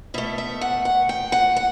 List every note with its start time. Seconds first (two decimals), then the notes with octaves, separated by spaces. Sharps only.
0.14 B2 A3 E5
0.38 E5
0.61 F#5
0.85 F#5
1.09 G5
1.32 F#5
1.56 F#5